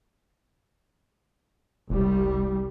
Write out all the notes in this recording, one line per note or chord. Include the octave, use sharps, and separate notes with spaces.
F1 C2 G3